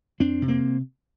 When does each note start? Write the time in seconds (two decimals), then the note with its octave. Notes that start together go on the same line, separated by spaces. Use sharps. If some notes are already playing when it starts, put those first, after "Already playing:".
0.20 F2 C4 D4
0.42 C3
0.48 A#3 C4